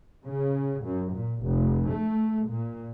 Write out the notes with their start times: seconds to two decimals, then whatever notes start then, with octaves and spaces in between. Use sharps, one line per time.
0.24 C#3
0.83 F#2
1.13 A#2
1.43 F1
1.91 A3
2.47 A#2